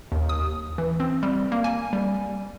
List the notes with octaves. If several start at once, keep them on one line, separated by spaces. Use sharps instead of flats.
D#2
D#6
E3
C4
G3
A#3
G#5
G3